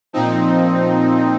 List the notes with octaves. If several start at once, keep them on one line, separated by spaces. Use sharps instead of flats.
A#2 F3 C4 D#4